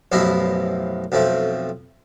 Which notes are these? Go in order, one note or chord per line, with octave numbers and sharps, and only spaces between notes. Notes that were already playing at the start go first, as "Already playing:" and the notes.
A1 F#2 B2 F3 E4 D#5
B1 F2 F3 A3